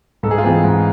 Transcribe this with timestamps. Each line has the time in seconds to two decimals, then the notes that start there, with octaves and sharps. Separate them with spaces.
0.23 G#2 A4
0.31 G#4
0.38 F4
0.44 E3 A3 C4 G#4
0.64 G#2